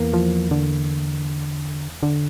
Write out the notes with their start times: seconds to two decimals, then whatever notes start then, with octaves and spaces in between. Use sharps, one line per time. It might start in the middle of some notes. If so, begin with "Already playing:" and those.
Already playing: E2 E3 A#3
0.13 F3
0.51 D3
2.03 D3